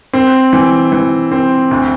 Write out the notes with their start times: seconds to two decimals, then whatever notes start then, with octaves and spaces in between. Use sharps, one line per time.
0.13 C4
0.53 E3
0.92 E3
1.32 C4
1.71 D2